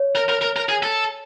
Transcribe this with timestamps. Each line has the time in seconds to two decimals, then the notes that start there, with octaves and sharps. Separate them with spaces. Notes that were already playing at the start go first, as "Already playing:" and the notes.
Already playing: C#5
0.15 A#4
0.29 A#4
0.42 A#4
0.56 A#4
0.69 G#4
0.83 A4